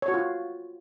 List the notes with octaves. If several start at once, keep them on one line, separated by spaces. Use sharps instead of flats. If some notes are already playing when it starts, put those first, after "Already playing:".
C#5
F#4
F4